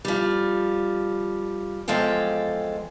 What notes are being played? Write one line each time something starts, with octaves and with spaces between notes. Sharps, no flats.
F3 G3
E2 F3 G#3 A4 F5 G5